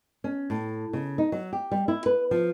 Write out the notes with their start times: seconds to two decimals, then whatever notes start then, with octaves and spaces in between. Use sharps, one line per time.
0.24 C#4
0.50 A2
0.93 C#3
1.18 D#4
1.32 F#3
1.53 G4
1.71 G3
1.88 E4
2.06 B4
2.31 F3